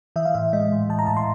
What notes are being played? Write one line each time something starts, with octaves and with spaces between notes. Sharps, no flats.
E3 E5
F5
A2 E5
G#3 D#5
A2
E3 A5
A#5
A2 A5
C6